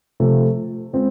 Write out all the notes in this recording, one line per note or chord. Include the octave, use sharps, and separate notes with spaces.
C3 F3 A3
G#3 C4 F4